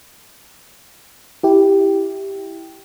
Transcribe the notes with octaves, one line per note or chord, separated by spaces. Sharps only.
E4 G4